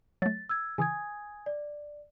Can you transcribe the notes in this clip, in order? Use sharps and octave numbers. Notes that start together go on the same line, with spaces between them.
F#3 A3 A6
E6 G#6
C#3 E3 G#5 D#6 G#6
D5